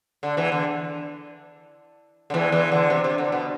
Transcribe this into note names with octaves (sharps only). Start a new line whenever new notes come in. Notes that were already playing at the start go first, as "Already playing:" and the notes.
D3
E2 E3
D3
D3
E2 E3
E2 E3
D3
C3
C3
D3
B2